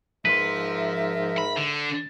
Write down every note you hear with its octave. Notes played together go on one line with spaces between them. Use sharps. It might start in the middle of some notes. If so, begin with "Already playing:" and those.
G#2 F3 A#4 B4 E5 C6
B5
D3